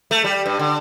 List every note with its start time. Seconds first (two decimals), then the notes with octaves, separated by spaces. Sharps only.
0.11 A3
0.24 G3
0.46 G2
0.59 D3